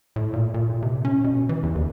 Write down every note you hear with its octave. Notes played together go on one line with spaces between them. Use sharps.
A2
A#2
A#2
A#2
C3
C#4
B2
E3
E2
D#2